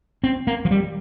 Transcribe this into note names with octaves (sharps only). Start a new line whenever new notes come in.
C4
A#3
F3
G3